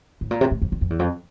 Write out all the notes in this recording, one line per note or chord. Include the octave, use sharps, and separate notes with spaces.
A2
A#2
C3
A2
F2
E2
F2
E2
F2